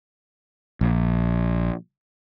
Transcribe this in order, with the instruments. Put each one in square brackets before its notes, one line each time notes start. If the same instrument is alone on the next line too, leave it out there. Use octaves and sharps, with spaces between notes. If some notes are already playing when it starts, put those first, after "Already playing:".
[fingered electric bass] A#1